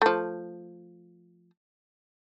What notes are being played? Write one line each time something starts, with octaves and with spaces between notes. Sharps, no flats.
F3 A3